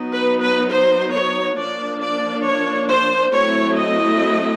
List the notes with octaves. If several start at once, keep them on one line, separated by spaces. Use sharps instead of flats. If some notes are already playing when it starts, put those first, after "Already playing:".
Already playing: F#3 B3 D#4
B4
B4
C5
C#5
F3 A#3 D4 D5
D5
C#5
C5
F#3 A3 C4 E4 C#5
D#5